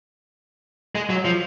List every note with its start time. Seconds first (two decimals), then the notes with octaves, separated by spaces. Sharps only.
0.95 G#3
1.10 F#3
1.25 F3